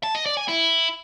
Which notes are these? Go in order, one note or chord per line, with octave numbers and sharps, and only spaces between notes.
A5
D#5
D5
G#5
E4